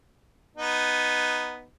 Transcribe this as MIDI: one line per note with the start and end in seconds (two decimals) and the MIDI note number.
0.57 1.65 59
0.57 1.65 63